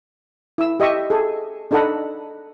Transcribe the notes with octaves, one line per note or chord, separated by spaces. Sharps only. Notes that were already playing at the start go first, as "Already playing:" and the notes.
E4 E6
G4 D#5 E5 C#6
G#4 A4
D4 D#4 A4 D#5 F#5 B5